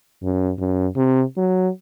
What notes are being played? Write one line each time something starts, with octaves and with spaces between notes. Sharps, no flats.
F#2
F#2
C3
F#3